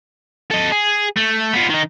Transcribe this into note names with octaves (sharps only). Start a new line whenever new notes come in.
A4 D#5
G#4
A3
B3 F4
D#3 D#4